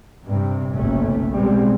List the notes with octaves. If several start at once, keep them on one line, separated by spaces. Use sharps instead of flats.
G2 C3
F#1 B1 A3 C#4
B2 G3 G#3 C4